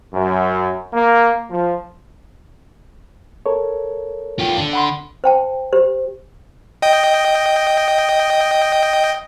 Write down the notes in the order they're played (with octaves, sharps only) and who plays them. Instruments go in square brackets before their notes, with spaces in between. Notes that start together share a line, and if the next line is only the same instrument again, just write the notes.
[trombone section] F#2
A#3
F3
[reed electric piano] A4 A#4 C#5
[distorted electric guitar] F4 G4
D3 D4
[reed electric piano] F#5 B5 C6
[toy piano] C5 G5 A5
G4 C5
[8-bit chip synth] D#5 G5